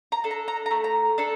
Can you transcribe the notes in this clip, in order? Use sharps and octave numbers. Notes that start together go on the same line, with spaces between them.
A#5
D4 A4
A#5
A#5
A#5
A3
A#5
D4 A4